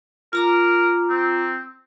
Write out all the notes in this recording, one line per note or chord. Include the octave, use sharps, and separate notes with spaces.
F4 A#4 A#5 D6
C4